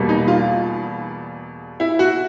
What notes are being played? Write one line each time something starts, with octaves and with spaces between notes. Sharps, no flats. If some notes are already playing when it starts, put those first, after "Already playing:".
Already playing: E2 B2 G3 A#3
D#4
F4
E4
F#4